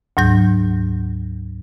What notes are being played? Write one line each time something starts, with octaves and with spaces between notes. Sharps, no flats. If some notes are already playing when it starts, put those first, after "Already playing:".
D2 G#2 F#3 G6